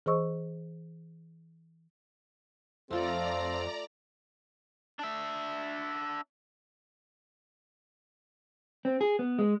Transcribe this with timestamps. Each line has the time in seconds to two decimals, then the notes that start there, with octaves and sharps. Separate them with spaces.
0.06 E3 G#4 C5 D#5 C#6 E6
2.91 F2 A3 C4 F4 A4 D5 A#5
4.99 D4 E5
8.85 C4
9.01 G#4
9.19 B3
9.39 G#3